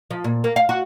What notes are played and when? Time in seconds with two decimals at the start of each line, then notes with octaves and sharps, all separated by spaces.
0.11 F3
0.24 A#2
0.44 A#3
0.56 F5
0.69 F#4